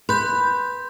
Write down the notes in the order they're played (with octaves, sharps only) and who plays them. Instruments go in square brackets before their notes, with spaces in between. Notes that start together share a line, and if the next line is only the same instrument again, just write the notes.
[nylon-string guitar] B4 [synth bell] C6 G6